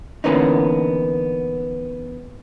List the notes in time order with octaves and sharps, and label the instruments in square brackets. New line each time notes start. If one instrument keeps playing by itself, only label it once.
[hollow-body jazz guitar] D3 E3 A#3 B3 C#4 D#4